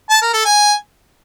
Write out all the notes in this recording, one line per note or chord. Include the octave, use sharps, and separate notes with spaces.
A5
A#4
A4
G#5